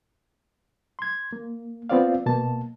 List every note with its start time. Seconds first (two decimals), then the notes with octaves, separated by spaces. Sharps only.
0.99 C6 G#6
1.33 A#3
1.89 B3 C4 F4 C5 D5 F5
2.26 B2 A#3 A5